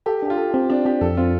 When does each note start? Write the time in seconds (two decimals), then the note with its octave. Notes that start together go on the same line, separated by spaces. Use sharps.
0.06 G4 A4
0.22 D4 G4
0.30 F4
0.38 A4
0.54 C4 G4
0.70 C4 D4
0.85 C4 G4
1.01 F2 A4
1.17 C4 F4